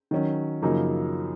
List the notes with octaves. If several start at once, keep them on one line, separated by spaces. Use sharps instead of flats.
D#3 F#3 C#4
F#2 C#3 F3 A#3 D#4